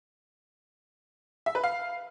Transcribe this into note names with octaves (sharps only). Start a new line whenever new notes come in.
E5
B4
F5